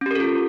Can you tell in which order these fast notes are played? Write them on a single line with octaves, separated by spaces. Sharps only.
C#4 G4 A#4 A4 F4